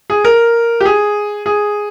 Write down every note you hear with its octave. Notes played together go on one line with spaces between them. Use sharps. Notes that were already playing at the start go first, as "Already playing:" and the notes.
G#4
A#4
G4
G#4
G#4